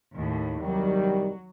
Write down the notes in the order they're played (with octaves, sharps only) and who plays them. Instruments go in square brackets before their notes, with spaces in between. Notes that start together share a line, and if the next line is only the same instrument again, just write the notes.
[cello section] D#2 A2
[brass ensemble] C2 D#3 G3 [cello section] F#3